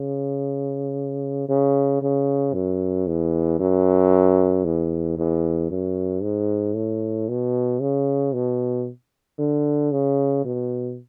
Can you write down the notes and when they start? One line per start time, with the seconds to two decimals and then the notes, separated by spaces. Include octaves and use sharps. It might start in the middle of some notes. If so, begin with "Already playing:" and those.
Already playing: C#3
1.49 C#3
2.02 C#3
2.54 F#2
3.07 E2
3.59 F#2
4.65 E2
5.18 E2
5.70 F#2
6.23 G#2
6.75 A2
7.29 B2
7.81 C#3
8.34 B2
9.39 D3
9.92 C#3
10.45 B2